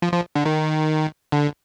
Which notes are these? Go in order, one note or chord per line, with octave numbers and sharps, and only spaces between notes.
F3
F3
D3
D#3
D3